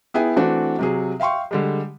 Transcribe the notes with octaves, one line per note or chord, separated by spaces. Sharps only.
B3 E4 G#4 E5 G5 G#5
E3 A3 C4 D4 F#4
C3 F#3 G#4
E5 F5 G5 C6 C#6
D3 G3 G#3